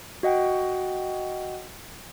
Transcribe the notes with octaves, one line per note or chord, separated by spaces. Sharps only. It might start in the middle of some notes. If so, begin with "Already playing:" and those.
F#4 D#5 F#5 G5